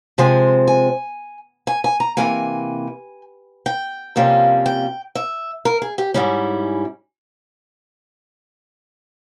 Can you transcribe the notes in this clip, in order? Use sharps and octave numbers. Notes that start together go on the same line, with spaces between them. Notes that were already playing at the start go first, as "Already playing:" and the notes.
C3 F3 G#3 C4 G#5
G#5
G#5
G#5
A#5
C3 E3 A#3 G#5
G5
F2 C3 G3 A#3 C#4
G5
E5
A#4
G#4
G4
G#2 G3 C#4 E4